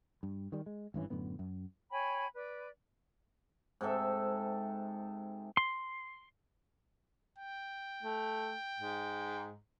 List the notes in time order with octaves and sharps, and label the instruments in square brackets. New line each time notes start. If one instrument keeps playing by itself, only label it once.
[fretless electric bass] G2
D#3 G3
G#3
G#1 G2 E3 C#4
F#2 A2 D3 B3
F#2
[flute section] C#5 G5 G#5 B5
B4 D5
[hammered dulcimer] G#2 C3 A4 E5
[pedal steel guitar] C6
[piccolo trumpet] G5
[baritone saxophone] A3
G#2